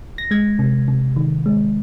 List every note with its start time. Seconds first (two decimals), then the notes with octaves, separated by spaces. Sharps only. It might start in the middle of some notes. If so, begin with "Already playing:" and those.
0.18 A#6
0.31 G#3 G#6
0.59 C3
0.88 C3
1.16 D#3
1.46 G#3